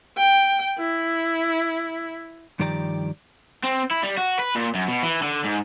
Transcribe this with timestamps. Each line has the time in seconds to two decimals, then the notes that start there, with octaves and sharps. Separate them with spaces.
0.18 G5
0.79 E4
2.59 G2 D#3 F3 G4 D5 A#5
3.63 C4
3.91 E4
4.03 G3
4.17 F#4
4.40 B4
4.55 A#2
4.75 F#2
4.88 B2
5.03 E3
5.22 D3
5.44 G#2